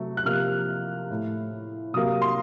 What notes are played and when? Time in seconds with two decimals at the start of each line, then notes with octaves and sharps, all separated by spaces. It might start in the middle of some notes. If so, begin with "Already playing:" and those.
Already playing: C3 F#3 A3
0.17 F#6
0.25 C3 F3 A#3 F6
1.10 A2 A3
1.94 C3 F#3 A#3 D#6
2.22 C6